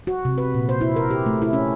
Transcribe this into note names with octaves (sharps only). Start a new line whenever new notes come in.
F#4
C3
B4
A#2
C5
E4
A#4
G4
A3
E4
C#4